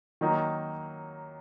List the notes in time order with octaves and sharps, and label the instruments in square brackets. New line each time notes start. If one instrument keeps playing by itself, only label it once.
[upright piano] D#3 F#3 A#3 D#4